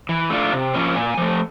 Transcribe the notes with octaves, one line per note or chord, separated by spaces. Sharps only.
E3
A3 D4 F4
C3
F3 A#3 C#4
A#2 G#5
F3 A3